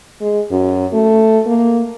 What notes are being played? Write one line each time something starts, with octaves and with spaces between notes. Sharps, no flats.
G#3
F#2
A3
A#3